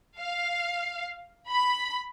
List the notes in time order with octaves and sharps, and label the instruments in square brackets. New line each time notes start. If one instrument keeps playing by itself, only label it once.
[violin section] F5
B5